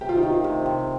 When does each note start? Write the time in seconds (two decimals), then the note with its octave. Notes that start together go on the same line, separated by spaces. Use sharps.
0.01 C3 G4
0.09 F4
0.17 D#4
0.23 D#3 F4
0.44 C3
0.66 C3